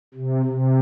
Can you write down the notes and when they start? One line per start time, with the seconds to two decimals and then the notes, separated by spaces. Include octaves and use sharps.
0.14 C3
0.45 C3